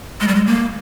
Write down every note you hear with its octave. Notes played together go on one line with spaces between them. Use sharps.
G#3
G3
G#3
A#3